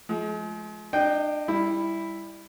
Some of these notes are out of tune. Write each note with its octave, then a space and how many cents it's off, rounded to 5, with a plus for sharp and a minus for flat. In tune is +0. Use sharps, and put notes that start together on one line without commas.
F3 +0 G#3 +40
D4 +35 D#5 +0 G5 -5
G3 +20 E4 +0